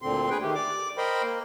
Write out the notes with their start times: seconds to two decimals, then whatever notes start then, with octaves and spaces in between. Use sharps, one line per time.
0.02 D2 A#2 D3 C4 C6
0.30 G#4 B4 G5
0.42 D#3 A3 G4
0.55 D5 D6
0.98 A#4 C5 D#5 G5 B5 C6
1.23 A#3